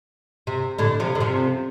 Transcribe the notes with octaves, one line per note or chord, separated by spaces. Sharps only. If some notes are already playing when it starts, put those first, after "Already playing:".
C3
A2 D3
C3 F3
D3
C3 F3